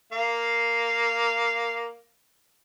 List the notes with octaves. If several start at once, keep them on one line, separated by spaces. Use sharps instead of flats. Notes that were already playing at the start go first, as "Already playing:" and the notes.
A#3 F5